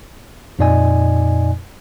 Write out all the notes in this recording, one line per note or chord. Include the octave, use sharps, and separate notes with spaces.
F2 A#2 D#4 D5 D#5 G#5